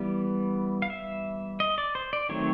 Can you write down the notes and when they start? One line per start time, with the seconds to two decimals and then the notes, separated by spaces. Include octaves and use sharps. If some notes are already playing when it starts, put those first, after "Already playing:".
Already playing: E3 G3 B3 D5
0.82 F5
0.90 E5
1.60 D#5
1.78 D5
1.95 C5
2.13 D5
2.29 D#3 F#3 A3 C4 C#5